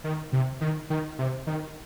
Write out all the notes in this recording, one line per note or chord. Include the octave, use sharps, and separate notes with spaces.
D#3
C3
D#3
D#3
C3
D#3